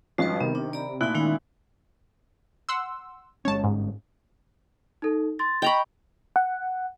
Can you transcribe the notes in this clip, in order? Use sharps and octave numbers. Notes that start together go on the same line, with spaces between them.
G#1 F3 G3 C#4 F#4 B4
C3 D#3 B3
D4
D5 A#5 B5
A#2 A3 D#4 E4 F#6
D#3 G#3 C#4 D#4
F#5 C6 E6
G1 G#3 C#4 C#5 A5
G#2
D#4 A4
C6 A6
D#5 G5 A#5 B5 C#6
F#5